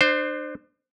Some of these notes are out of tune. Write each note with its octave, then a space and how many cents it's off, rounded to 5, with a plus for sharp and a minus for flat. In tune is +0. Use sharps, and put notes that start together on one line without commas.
D4 +35 C5 +0